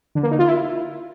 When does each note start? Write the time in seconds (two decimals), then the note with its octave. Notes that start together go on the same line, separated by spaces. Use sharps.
0.15 D3
0.23 A#3
0.31 D#4
0.39 F4
0.47 E4